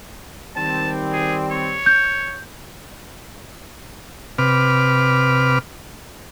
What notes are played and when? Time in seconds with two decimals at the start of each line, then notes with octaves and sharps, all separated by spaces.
0.56 D#3 G3 C4 A5
1.12 G#4
1.51 C#5
1.86 G6
4.38 C3 B4 D6 F6